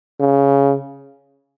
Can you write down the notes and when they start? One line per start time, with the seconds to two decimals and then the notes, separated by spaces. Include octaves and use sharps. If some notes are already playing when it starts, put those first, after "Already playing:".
0.20 C#3